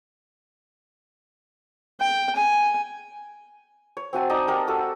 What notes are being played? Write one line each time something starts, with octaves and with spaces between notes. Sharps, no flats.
G5
G#5
C#5
C4 F#4 G#5 A5
D#4 D5 D#5
G4 A#4 F#5 A5
F#4 A4 E6